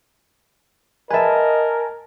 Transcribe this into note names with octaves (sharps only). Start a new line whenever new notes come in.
A#4 B4 D#5 E5 G#5 A5